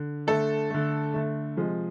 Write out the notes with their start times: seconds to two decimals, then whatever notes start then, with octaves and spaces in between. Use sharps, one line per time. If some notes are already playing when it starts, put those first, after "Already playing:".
Already playing: D3
0.27 D3 A3 A4
0.70 D3 A3
1.14 D3 A3
1.57 C3 F3 G#3